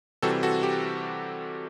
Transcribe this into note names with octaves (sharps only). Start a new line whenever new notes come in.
C3 E3 G3 C4 F#4 A4
F#4 A4
G4